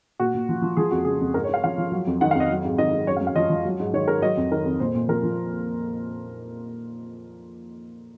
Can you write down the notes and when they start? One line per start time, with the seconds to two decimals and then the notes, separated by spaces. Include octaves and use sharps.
0.19 A#2 F#4
0.34 A#2
0.49 F3
0.62 F3
0.77 F3 G#4
0.91 F2 F#4
1.05 C#3 G#4
1.21 F2
1.34 G#2 A#4
1.44 C#5
1.49 G#2 F5
1.64 F3 F5
1.78 F3
1.92 F#3
2.07 F2
2.21 D#3 F#5
2.31 F5
2.35 F2 D#5
2.50 F#3
2.64 G#2
2.78 D#3 D#5
2.93 G#2
3.07 F#2 C#5
3.17 F5
3.21 F#2
3.27 F5
3.36 F3 D#5
3.50 F3
3.65 F#3
3.80 G#2
3.93 D#3 C#5
4.08 G#2 A#4
4.22 F#3 D#5
4.37 F2
4.51 D#3 A#4
4.66 F2
4.80 A#2 C5
4.95 A#2
5.08 F3 A#4
5.23 F3